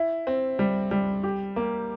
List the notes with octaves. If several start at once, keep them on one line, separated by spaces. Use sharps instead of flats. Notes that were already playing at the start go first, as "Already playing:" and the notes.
Already playing: E4
C4
G3
G3
G4
A#3